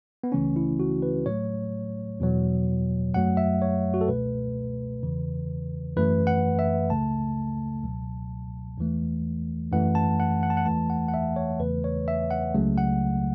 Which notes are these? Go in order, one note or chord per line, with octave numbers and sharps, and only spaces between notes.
B3
C#2 C#3 E3 A3 C#4
E4
F#4
B4
A2 F#3 A3 C#5
E2 B2 F#3
F#2 F#3 A3 F#5
E5
C#5
F#4
A4
C#2 B2 A3 B4
E2 C#3 E3
F#2 E3 A3 B4
F#5
E5
C#2 C#3 A3 A5
C#2 B2 F#3
E2 E3 A3
F#2 E3 A3 F#5
A5
F#5
F#5
A5
F#5
E2 E3 A3 A5
F#5
F#5
E5
C#5
E2 C#3 E3 A3 B4
C#5
E5
F#5
C#2 C#3 F#3 A3
F#5